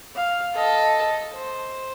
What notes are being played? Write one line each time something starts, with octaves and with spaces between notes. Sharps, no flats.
F5
A4 D#5
C5